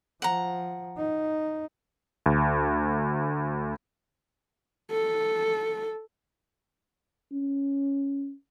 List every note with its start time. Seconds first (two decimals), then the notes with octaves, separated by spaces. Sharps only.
0.22 F3 F#5 A#5
0.97 D#4
2.26 D2
4.91 A4
7.32 C#4